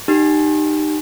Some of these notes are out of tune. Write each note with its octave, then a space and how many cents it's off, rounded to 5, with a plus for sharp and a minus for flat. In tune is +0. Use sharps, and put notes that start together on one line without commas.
D#4 -25 G4 -10